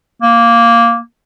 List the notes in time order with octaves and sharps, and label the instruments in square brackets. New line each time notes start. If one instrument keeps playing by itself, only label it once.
[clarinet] A#3